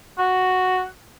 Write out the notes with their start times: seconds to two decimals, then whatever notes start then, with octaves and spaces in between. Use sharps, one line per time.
0.19 F#4